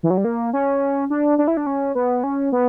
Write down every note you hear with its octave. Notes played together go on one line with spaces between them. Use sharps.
E3
F#3
G3
A#3
C#4
D4
D4
E4
D4
C#4
B3
C#4
B3